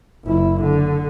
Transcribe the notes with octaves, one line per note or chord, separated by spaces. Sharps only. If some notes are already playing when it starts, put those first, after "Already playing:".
F#1 E4
D3